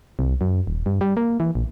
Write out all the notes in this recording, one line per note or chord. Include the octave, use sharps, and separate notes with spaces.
C2
F#2
D#1
G2
G3
A#3
E3
A#1